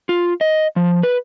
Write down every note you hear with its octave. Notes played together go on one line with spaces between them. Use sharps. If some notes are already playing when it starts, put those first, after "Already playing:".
F4
D#5
F3
B4